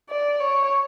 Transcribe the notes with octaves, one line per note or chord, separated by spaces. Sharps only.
D5
C#5